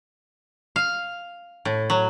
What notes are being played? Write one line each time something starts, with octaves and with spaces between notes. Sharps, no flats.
F5
A2
F#3